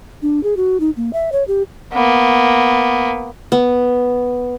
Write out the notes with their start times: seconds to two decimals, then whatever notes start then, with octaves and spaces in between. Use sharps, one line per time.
0.22 D4
0.43 G#4
0.57 F#4
0.80 D#4
0.97 A#3
1.13 E5
1.32 C#5
1.48 G4
1.93 A#3 B3
3.52 B3